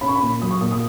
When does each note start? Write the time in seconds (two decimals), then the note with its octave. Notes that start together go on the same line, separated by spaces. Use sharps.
0.01 C#4 B5
0.08 C#6
0.16 B5
0.22 A#2
0.42 F#3 D#6
0.51 C#6
0.61 A#2 D#6
0.72 D#6